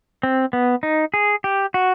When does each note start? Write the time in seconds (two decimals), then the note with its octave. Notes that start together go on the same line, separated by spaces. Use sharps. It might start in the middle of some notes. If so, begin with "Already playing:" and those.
0.23 C4
0.53 B3
0.83 D#4
1.14 G#4
1.44 G4
1.74 F#4